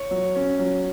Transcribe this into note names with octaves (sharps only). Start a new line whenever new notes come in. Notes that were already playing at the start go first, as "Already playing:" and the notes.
Already playing: C#5
F#3
C#4
F#3